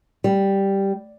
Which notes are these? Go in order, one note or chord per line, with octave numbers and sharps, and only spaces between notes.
G3